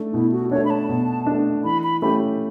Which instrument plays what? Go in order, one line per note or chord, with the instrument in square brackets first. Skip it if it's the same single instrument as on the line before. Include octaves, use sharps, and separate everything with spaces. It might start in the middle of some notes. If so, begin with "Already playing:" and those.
Already playing: [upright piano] A3 D4
[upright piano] B2 [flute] E4
[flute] F#4
[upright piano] A3 D4 [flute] C#5
[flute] B5
A5
[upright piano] B2
A3 D4
[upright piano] E3 [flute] B5
[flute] B5
[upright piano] A3 C#4 G4 [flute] B5